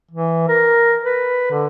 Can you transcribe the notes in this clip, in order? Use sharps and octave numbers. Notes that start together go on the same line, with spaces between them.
E3
A#4
B4
D3